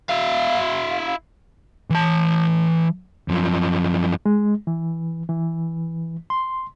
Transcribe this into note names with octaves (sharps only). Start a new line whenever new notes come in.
E4 F5
E3 A5
F#2 F3
G#3
E3
E3
C6